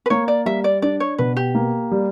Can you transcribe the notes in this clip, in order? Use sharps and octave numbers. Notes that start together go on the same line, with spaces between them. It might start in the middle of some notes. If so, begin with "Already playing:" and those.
B4
A#3 C#5
D5
G3 E5
D5
D4 D5
C#5
B2 B4
G4
A#3
G3